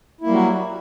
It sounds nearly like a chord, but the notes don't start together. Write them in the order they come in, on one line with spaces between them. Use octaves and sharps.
E4 A#3 G3 F#3 F#4